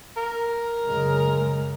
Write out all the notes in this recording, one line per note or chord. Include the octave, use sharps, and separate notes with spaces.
A#4
F#2 C#3 G#3